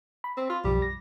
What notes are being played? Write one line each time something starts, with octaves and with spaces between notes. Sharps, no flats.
B5
C4
F4
B1 F#2 F3 G3
A#6